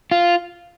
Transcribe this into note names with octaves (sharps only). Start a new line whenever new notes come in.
F4